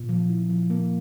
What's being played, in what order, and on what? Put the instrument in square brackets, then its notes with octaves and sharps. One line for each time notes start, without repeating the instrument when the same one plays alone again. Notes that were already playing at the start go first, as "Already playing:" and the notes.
Already playing: [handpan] A#2
F3
E4
F3
A#3